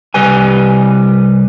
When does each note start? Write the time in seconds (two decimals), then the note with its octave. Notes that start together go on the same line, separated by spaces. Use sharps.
0.14 C2 G3 B4 G#5